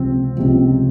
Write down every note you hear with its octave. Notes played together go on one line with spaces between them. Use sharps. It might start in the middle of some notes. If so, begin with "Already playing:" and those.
Already playing: C#2 C3 F3 C4
C#2 C3 F3